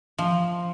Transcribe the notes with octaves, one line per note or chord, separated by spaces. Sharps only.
F3